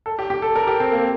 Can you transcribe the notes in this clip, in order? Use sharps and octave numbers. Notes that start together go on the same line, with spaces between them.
A4
G4
G4
A4
A#4
G4
C4
A#3